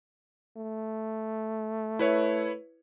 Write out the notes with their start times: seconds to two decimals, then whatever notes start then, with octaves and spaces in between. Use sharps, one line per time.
0.57 A3
1.99 E4 B4 C#5